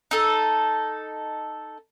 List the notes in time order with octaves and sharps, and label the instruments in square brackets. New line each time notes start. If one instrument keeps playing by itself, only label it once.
[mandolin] D#4 A4